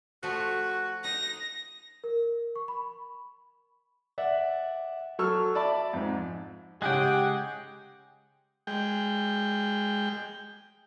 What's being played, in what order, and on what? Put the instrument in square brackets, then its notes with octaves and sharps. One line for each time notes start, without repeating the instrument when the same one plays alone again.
[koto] F3 A3 [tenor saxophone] F#4
[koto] D#4 [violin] A#6
[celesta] A#4
C#6
B5
[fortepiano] D5 E5 F#5
F#3 A4 C#6 E6 F6
D5 E5 A5 B5 D6
F2 G#2
[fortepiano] C#3 F#6 [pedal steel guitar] G#3 G#4 G5 [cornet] G4 [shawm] F#5
[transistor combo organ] G#3 G5